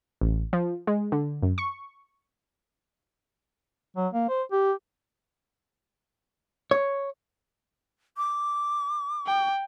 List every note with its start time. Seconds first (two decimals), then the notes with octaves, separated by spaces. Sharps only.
0.21 A1
0.53 F3
0.87 G#3
1.12 D3
1.43 F#2
1.58 C#6
3.96 F#3
4.13 A#3
4.29 C5
4.52 G4
6.71 C#5
8.17 D6
9.27 G5